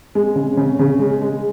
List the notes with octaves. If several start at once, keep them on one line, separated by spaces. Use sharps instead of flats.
G#3
C#3
C#3
C#3
G#3
G#3